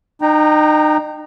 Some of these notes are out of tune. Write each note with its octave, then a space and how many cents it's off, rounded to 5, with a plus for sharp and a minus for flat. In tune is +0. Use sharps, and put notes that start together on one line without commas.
D#4 -35 G5 +0 A#5 +0